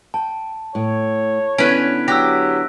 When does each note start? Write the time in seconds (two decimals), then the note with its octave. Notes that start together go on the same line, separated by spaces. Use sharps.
0.14 G5 A5
0.75 A2 C#5
1.58 D3 B3 C#4 E4 B4 B6 D7
2.08 F#3 G4 E6 F#6 A#6